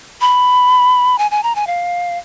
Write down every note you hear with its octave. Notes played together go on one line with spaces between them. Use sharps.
B5
G#5
G#5
A#5
G#5
F5